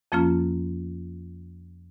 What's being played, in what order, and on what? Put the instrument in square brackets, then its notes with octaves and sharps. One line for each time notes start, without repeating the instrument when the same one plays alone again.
[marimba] F2 F3 A#3 C#4 F4